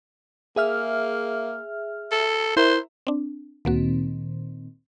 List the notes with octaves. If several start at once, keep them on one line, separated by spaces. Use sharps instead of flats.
A#3 G#4 E5 F6
A4
E4 A#4 C5 E5
C4 D4
D2 A#2 D#3 A#3 C4 F#4